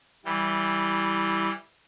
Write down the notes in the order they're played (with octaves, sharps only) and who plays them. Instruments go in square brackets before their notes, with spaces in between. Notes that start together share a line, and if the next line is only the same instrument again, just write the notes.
[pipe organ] E3 G3